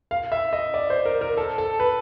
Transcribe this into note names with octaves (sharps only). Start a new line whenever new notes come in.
F5
E5
D#5
D5
C5
A#4
A#4
A4
A4
B4